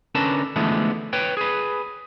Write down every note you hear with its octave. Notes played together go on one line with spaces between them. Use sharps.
D3 C#4 A#4 B4 A5
D3 E3 F3 G#3 A3 B3
B4 C#5 G5
G#4 B4